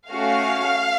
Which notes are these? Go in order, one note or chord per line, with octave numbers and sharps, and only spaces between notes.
A3 C#4 F#4 F5